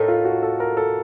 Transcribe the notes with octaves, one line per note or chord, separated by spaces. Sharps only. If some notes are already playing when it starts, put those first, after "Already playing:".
Already playing: A2 A3 D#4 A4 A#4
F4
F#4
A4
A#4
A4